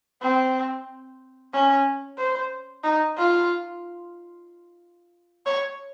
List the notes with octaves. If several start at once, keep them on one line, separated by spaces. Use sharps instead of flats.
C4
C#4
C5
D#4
F4
C#5